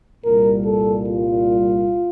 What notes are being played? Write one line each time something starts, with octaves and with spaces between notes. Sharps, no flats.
C2 A#2 G3 A#4
A4
F4